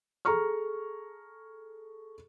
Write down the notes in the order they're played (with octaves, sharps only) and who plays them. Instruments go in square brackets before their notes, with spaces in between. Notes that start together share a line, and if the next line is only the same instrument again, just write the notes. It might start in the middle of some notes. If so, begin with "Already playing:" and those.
[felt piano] G#4 A4 A#5 C#6 F6